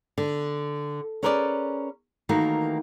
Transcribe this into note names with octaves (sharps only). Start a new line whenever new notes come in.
D3
C#4 G#4 A#4 B4 C#5 D5
D#3 E3 A3 A#3 F#4